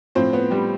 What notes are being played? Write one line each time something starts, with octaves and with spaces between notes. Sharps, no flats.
A2 F3 C4 C5
B3 B4
G3 G4